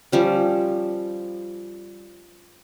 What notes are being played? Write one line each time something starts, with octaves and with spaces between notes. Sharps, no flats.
F3 G3 C#4